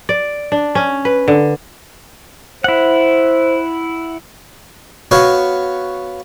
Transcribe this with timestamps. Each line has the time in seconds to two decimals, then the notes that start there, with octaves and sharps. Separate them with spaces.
0.09 D5
0.52 D4
0.75 C#4
1.05 B4
1.28 D3
2.64 E4 C5 F#5
5.11 B3 F#4 C#5 F5